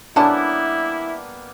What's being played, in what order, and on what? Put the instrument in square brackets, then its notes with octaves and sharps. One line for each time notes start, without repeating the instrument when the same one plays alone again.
[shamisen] D3 C#4 A5 [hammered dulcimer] G3 A#3 B3 [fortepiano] D4 [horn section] E4